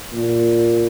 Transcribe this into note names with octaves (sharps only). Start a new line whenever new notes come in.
A#2